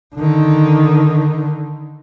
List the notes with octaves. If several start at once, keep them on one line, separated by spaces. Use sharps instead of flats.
D3 D#3